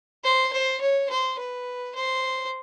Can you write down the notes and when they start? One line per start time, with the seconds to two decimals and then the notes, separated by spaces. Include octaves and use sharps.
0.24 C5
0.53 C5
0.81 C#5
1.09 C5
1.39 B4
1.95 C5